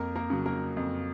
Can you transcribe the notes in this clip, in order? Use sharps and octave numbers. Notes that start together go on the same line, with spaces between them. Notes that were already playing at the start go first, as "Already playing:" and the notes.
Already playing: F2 A#3 A#4
A#3 A#4
C#3 F#3
A#3 A#4
F2